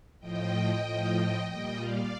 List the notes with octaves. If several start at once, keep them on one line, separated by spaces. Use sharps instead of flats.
A2 F3 D#5 G5
A2 F3
A#2 G3 D#5 G5
D5 F5